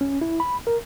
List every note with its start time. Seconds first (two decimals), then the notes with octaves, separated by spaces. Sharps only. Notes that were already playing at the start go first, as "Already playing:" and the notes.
0.01 C#4
0.21 E4
0.40 B5
0.67 A#4